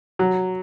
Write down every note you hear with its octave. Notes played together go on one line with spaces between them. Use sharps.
F#3